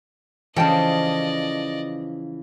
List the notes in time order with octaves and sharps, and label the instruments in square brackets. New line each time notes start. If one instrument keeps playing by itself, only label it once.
[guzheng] C#3 F3 [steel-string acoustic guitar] E3 [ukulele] A4 G5 A5 [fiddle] D5 D#5